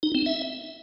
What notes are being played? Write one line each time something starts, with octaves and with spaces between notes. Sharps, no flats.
D#4
C4
E5